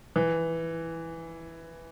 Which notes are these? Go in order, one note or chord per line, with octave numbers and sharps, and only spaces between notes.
E3